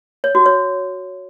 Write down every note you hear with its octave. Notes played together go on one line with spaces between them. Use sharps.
C#5
F#4
C#5